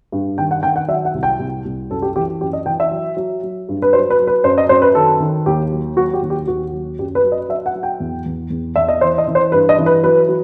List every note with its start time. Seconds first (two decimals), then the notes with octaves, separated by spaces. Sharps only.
0.12 G2
0.38 D#3 G5
0.51 F#5
0.63 D#3 G5
0.76 F#5
0.88 F#3 E5
1.05 F#5
1.14 C2
1.23 G5
1.39 C2
1.65 C2
1.90 F#2 A4
2.02 G4
2.16 E3 G4
2.41 F#2 G4
2.53 D#5
2.66 E3 G5
2.80 E5
2.91 F#3
3.17 F#3
3.43 F#3
3.69 G2
3.82 B4
3.93 F#3 C5
4.10 B4
4.19 F#3
4.27 B4
4.44 F#2 C5
4.58 D#5
4.69 F#2 C5
4.82 B4
4.95 D#3 A4
5.20 D#3
5.46 D#2 G4
5.72 F#3
5.97 F#3 F#4
6.14 G4
6.22 D#2
6.30 G4
6.47 D#2 F#4
6.73 F#3
6.99 F#2 G4
7.15 B4
7.24 F#3
7.32 D#5
7.49 F#3 E5
7.66 F#5
7.75 F#3
7.83 G5
8.00 E2
8.26 E2
8.50 E2
8.76 E2 E5
8.89 D#5
9.01 E3 C5
9.18 D#5
9.27 E3
9.35 C5
9.52 G2 B4
9.69 D#5
9.79 E3
9.86 B4
10.03 F#3 B4
10.29 F#3